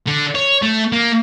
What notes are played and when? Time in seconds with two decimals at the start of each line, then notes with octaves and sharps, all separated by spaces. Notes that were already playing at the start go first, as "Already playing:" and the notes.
0.07 D3
0.35 C#5
0.63 A3
0.93 A#3